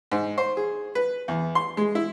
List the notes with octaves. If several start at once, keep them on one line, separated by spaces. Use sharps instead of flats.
G#2
C5
G#4
B4
E2
C6
G#3
E4